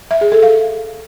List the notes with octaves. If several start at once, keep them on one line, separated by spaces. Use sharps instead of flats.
E5
G#4
A4
F5